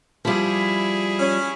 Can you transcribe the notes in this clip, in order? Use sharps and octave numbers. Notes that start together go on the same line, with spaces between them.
F3 G3 E4 G#4
C#4